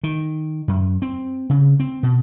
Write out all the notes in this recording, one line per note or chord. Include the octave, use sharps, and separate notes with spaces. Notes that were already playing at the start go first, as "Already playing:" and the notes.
D#3
F#2
C4
C#3
C4
B2